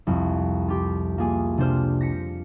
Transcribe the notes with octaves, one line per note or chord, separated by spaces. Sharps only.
C2 F2
F4 G4
A#3 F4 G#4 G#5
C3 D4 C5 F6
A#6 B6 C#7